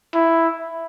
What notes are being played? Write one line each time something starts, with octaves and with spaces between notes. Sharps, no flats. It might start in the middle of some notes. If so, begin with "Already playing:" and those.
E4